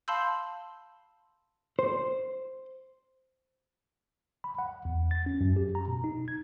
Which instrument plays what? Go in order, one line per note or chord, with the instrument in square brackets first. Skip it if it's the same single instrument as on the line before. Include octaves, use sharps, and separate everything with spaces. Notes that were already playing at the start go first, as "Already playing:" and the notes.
[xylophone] F5 A5 B5 C6 E6 G6
[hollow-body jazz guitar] C5
[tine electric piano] B5
F#5
E2
A6
C#4
F#2
G4
A#5
B2
D#4
G#6